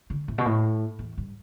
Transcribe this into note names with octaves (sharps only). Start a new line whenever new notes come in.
D3
A2
B2
A2
E2
G2